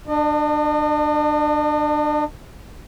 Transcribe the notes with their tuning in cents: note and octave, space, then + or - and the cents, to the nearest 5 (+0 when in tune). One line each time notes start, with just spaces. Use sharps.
D4 +25 D#5 -40